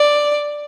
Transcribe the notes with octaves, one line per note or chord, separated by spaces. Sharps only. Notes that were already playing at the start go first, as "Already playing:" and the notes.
Already playing: D5